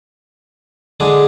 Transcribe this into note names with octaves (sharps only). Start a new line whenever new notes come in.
D3 G#3 D4 G#4